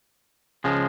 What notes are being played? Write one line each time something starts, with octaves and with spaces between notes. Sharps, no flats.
C#3 F3 G#3